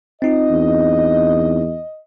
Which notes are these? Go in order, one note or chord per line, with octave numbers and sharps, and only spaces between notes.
C4 D#4 F4 D#5
E2